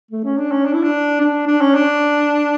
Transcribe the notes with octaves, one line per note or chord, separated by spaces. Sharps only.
A3
C#4
D4
C#4
D4
E4
D4
D4
D4
C#4
D4